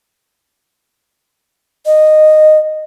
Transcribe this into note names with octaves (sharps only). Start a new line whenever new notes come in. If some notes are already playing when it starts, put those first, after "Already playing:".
D#5